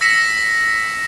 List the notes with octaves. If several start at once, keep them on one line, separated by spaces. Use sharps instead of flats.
E6 A#6 B6 C#7 E7